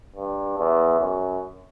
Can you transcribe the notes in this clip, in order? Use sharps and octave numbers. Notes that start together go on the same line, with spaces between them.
G2
E2
F#2